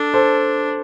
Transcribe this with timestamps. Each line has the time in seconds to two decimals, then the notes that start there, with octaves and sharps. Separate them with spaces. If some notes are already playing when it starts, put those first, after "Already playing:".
Already playing: D4 A4
0.14 A4 C5